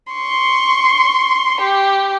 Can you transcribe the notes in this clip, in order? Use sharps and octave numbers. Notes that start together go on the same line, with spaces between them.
C6 C#6
G4